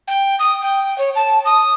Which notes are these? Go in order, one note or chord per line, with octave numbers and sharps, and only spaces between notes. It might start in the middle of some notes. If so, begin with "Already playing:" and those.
G5
D#6
G5
C#5
A5
D#6